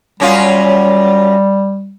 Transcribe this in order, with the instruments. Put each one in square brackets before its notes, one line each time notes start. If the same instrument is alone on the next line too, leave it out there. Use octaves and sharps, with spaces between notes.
[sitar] F#2 C#4 F4 [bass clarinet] G3